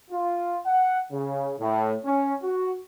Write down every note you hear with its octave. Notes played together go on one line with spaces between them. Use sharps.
F4
F#5
C#3
A2
C#4
F#4